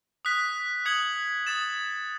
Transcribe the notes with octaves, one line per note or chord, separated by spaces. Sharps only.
D#6 F#6 B6
D#6 G#6 C#7 F#7
D#6 A6 E7